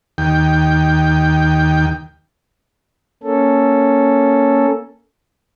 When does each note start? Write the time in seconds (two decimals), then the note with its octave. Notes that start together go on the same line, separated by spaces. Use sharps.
0.18 D#2 G5
3.23 A#3 C#4 A4